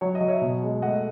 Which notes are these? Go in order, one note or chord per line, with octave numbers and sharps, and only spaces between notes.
F#3 C#5
D#5
F#3
C#5 E5
B2
G#3
A3 D#5 F#5